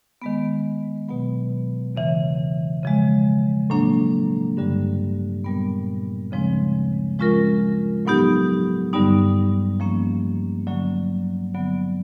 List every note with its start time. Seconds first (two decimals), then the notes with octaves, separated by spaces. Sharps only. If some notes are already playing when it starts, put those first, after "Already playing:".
0.22 D#3 G#3 B3
1.09 B2 F#3 B3
1.95 E2 C#3 E3
2.83 C#3 F3 G#3
3.70 A2 F#3 A#3 D4
4.57 G2 D3 G3
5.44 A#2 G3 B3
6.31 D2 C#3 F3 G#3 C4
7.19 F3 G#3 C#4 F4 A#4
8.05 A2 F#3 B3 D#4 G4
8.93 G2 D3 G3 B3 D#4
9.80 F3 A#3 C#4
10.67 D3 F#3 A#3 C#4
11.54 D3 F#3 B3